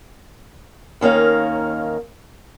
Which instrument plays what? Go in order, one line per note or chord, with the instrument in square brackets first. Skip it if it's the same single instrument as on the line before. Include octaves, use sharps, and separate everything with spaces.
[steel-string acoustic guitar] D#2 D#3 A#3 C#4 F5